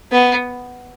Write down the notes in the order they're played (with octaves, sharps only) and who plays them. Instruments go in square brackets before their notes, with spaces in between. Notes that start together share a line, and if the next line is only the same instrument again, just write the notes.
[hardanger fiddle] B3